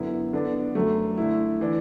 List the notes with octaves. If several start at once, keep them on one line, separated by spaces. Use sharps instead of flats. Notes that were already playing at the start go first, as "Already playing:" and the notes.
Already playing: F#2 D3 B3 E4
D3 B3 D4
F#2 D3 F#3 A3
D3 A3 E4
E3 D4